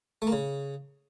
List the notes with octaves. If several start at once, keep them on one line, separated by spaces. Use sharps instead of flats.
A3
A#3
C#3